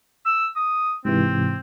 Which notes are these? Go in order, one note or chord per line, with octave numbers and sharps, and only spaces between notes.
E6
D#6
G#2 C3 E3 C4